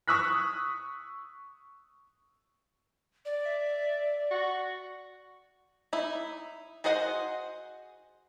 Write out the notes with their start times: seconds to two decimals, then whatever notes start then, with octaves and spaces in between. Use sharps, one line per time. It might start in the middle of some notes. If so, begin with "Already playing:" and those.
0.08 C#6 D#6 E6 F#6 B6
3.25 D5
3.45 E5
4.31 F#4
5.93 D#4 E4
6.84 F#4 G#4 C5 D#5 F#5